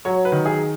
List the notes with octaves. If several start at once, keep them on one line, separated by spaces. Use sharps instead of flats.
F#3 C#5
B4
D#3
G#4